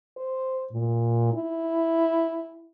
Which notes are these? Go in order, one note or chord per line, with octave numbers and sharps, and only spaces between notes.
C5
A#2
E4